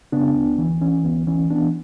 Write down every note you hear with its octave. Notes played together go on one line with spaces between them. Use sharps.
C#3 B3 D4
D2
E3
E3 C#4
D2 B3
E3 C#4
E3 B3 D4